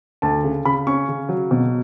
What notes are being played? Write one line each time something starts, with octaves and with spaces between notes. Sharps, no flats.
D2 A5
C#3
C#3 B5
C#4 C#6
C#3
F#3
B2